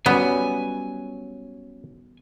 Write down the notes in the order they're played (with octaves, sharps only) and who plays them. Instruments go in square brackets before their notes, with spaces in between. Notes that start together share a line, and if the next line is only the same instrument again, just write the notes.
[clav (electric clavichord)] F#3 C#4 [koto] G3 B3 [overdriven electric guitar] G#5